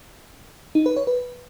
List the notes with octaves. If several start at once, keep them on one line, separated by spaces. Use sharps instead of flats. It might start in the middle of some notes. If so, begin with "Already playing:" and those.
D#4
B4
C#5
B4